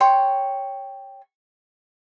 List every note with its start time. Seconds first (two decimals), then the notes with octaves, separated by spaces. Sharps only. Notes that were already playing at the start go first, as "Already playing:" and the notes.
0.01 C#5 G5 C6